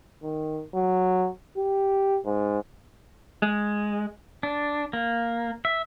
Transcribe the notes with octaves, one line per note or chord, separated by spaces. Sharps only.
D#3
F#3
G4
G#2
G#3
D4
A#3
E5